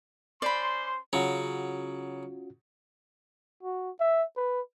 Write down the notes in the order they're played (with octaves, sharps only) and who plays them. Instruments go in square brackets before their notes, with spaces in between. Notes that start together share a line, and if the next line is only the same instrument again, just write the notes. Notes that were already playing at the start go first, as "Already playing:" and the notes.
[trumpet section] C#4 C5 C6 [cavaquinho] D5 B5
[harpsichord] C#3 F#3 [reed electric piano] C#4 F4 F#4
[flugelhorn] F#4
E5
B4